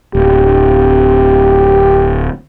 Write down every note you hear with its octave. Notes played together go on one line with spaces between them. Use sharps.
D1 G4